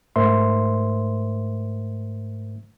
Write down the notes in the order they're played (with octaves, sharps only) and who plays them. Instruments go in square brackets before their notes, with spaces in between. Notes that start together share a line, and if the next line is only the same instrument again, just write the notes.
[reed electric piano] G#2 A3 A#4 C5 E5 C6